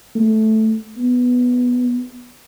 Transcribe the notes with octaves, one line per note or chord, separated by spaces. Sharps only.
A3
B3